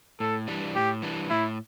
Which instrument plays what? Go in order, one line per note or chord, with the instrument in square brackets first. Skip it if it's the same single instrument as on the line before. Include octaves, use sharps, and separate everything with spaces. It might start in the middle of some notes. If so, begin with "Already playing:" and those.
[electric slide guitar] A2 [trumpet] A4
[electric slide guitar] E3 G3 D4
[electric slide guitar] A2 [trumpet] G4
[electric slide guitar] E3 G3 D4
[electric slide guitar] A2 [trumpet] E4